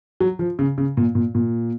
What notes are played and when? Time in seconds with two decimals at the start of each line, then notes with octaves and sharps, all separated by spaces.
0.20 F#3
0.39 F3
0.59 C#3
0.78 C#3
0.97 A#2
1.15 A#2
1.35 A#2